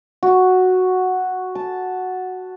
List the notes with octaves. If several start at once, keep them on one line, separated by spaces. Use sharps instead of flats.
F#4
A5